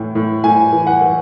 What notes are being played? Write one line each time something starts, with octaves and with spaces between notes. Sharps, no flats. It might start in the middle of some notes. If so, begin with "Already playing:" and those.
Already playing: A2 E3
A2
A2 G#5
E3
F#5
E3